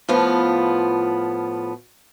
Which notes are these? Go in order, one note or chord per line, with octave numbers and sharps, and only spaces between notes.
A2 F3 B3 F4